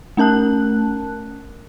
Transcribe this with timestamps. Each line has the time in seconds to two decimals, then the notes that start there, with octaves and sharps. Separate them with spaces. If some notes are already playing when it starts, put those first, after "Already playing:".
0.17 A3 C#4 A#4 A5 F#6